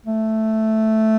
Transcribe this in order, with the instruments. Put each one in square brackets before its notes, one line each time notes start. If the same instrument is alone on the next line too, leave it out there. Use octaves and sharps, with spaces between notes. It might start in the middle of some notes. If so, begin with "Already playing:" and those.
[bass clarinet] A3